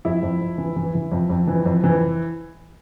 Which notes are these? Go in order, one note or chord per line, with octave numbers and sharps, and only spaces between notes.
F2 E4
F2
F2
E3
E3
E3
F2
F2
E3
F2
E3